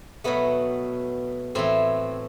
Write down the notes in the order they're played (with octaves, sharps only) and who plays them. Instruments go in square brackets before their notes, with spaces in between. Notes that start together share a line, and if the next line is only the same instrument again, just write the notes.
[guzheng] B2 F#3 A3 B3
A2 E3 A3 C4